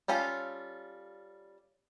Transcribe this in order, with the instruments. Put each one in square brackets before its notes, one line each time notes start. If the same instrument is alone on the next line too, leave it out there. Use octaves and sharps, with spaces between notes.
[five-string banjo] G3 C#4 F4 A4 F5